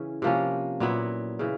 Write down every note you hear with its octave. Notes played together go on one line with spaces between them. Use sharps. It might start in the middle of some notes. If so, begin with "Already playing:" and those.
Already playing: C#3 E3 C#4
C3 F3 A#3 C#4
A#2 F#3 B3 E4
C#3 E3